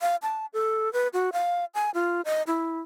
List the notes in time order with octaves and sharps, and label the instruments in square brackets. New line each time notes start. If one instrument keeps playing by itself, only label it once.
[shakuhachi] F5
A5
A4
B4
F#4
F5
G#5
F4
D#5
E4